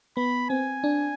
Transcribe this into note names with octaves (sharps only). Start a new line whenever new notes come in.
B3 B5
C4 G#5
D4